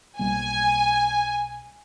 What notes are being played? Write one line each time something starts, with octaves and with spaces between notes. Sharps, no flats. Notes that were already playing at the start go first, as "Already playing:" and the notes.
B1 G3 A#3 G#5